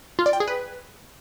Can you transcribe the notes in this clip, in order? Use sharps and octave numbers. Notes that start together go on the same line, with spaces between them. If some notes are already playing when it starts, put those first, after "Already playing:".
F4
D5
G5
G#4
B4